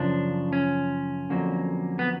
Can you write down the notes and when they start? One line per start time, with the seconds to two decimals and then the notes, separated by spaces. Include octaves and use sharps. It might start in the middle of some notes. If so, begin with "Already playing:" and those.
Already playing: F#2 C#3 F3 D4
0.53 C#4
1.30 F2 D3 F#3 A#3
1.99 B3